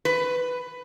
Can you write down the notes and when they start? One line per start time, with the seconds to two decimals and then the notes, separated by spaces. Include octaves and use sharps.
0.05 B4